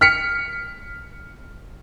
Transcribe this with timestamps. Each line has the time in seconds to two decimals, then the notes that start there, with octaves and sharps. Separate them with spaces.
0.01 F6 B6 C#7